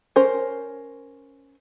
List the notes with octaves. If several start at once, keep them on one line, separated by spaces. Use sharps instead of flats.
C#4 A#4 C5